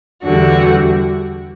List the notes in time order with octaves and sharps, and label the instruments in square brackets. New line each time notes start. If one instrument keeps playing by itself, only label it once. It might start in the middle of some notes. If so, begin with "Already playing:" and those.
[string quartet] E2 D3 G3 F#4